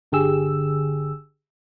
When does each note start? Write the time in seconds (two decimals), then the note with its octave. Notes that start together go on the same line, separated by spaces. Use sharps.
0.12 G1 D3 G4 G#4 E6